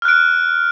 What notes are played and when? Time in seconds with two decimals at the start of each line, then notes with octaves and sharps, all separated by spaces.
0.02 F6
0.05 F#6
0.08 D7